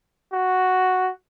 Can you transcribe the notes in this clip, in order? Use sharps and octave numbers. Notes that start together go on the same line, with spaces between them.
F#4